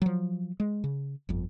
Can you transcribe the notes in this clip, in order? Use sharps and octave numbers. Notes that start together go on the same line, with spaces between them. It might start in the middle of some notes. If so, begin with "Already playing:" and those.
F3 F#3
G#3
C#3
G1 F2